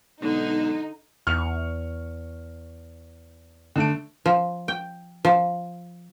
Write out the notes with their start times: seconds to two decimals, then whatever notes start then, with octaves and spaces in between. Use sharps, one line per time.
0.22 B1 G#2 D3 D#4
1.27 E2 C#6 F6
3.76 D3 A3 D7
4.26 F3
4.68 G5
5.25 F3